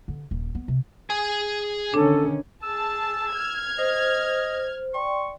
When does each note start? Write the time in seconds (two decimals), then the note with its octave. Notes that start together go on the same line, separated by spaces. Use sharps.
0.08 D3
0.31 D#1
0.55 B3
0.68 C3
1.10 G#4 G#5
1.94 D3 D#3 C#4 D4 A4
2.63 G#4 A5 E6
3.33 F6 G#6
3.78 C5 D#5
4.94 D5 G5 C6 C#6